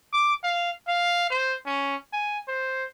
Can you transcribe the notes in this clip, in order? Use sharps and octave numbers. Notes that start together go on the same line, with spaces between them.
D6
F5
F5
C5
C#4
G#5
C5